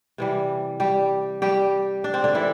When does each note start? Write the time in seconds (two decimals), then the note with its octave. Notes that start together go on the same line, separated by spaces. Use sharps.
0.18 C3 E3 G3
0.80 G3 G4
1.42 G3 G4
2.04 D4
2.14 C4
2.24 D3 D4
2.35 E3 E4